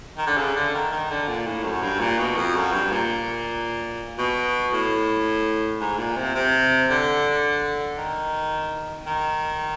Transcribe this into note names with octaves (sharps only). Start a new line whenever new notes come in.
D#3
D3
C#3
D3
D#3
D#3
D3
A#2
A2
F#2
G2
A#2
B2
F2
F#2
G2
A#2
B2
A2
G#2
A#2
C3
C3
D3
D#3
D#3